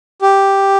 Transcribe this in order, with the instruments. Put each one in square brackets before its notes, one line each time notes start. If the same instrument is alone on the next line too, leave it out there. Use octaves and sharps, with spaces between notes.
[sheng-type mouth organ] G4